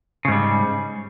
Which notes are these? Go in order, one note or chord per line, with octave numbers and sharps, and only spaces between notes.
G#2 C#3 G3